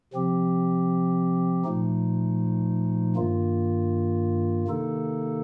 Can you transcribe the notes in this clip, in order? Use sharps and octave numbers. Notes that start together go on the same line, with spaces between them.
C3 F3 C4 G4
A#2 F3 A3 D#4
G2 D#3 A#3 F4
C3 D#3 A#3 D#4 A4